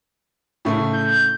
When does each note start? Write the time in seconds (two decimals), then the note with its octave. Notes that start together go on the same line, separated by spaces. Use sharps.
0.65 A2 C#3 A3
0.93 G6